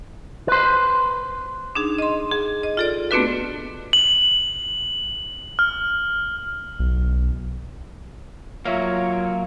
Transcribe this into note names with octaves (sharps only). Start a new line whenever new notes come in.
B4 C5
D4 D#4 G#4
D#5 C6
G#4
D#5
F4 A4 D5
A3 B3 C4 D4 F#4 B4
F#7
F6
B1
F#3 A#3 F4 C#5 E5 F5